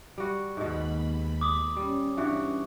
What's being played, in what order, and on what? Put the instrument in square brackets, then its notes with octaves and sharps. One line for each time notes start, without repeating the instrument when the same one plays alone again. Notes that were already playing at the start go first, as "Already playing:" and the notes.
[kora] G3 F#4
[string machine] D#2 B5 [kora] G#2 B2
[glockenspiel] D6 D#6
[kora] G3 [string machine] C#4
[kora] G2 E3 F#4